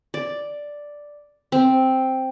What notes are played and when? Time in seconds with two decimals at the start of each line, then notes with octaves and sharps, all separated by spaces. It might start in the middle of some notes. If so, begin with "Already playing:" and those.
0.14 D5
1.52 C4